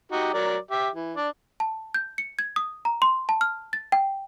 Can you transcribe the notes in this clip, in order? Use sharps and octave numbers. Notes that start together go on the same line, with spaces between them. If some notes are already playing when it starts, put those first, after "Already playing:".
D#4 F#4 G4
F#3 A#4 D5
G4 E5
E3
D4 D5
A5
G6
C#7
G#6
D#6
A#5
C6
A5
F6
A6
G5